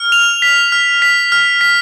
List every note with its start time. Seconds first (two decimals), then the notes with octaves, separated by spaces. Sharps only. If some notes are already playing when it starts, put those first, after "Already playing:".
Already playing: F6
0.12 F7
0.42 B6
0.72 F6
1.02 B6
1.32 F6
1.61 B6